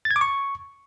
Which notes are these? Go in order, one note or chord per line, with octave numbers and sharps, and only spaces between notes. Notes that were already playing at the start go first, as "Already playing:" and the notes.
A6
G#6
D6
C#6